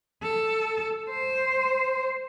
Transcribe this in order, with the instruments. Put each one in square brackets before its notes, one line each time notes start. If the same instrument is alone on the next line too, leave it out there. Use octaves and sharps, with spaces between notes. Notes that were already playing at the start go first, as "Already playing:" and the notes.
[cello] A4
C5